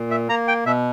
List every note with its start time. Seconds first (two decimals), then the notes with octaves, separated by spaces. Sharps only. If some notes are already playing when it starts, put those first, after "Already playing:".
Already playing: A#2
0.11 E5
0.28 A#3 A#5
0.48 G5
0.66 B2 E5